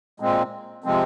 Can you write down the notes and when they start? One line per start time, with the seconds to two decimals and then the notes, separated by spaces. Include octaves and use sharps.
0.20 A#2 G#3 C4
0.84 C3 F3 G#3 C4